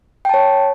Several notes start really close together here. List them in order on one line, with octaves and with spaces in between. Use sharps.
G5 A5 C#5